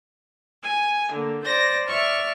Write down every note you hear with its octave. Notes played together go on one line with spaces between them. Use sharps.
G#5
D3 A#3
C5 D5 G6 A#6
D5 E5 C#6 F6